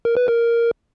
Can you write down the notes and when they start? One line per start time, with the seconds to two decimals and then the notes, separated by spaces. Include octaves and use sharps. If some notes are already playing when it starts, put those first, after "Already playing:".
0.05 A#4
0.17 B4
0.28 A#4